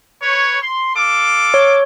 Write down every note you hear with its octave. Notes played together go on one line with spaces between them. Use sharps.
B4 C#5
C6
A4 F5 D6
C#5